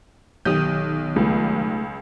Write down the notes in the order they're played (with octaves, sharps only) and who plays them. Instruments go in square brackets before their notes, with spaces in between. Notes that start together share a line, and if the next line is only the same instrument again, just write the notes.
[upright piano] B1 G4 [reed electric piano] D#3 D#6 G6
[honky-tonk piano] C#2 [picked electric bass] A3